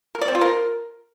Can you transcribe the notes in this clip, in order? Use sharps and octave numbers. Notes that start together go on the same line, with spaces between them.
A#4
D5
C4
F4
A#4